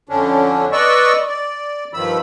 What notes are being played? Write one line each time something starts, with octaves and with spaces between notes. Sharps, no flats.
F2 D3 C#4 D4
B4 D5 D#5 C#6 E6
D5
G2 D#3 F3 B5 E6